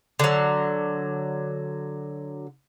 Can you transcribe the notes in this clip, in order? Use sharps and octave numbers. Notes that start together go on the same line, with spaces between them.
D3 F#3